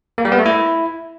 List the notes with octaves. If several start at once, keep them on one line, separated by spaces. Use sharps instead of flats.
A#3
G3
B3
A3
E4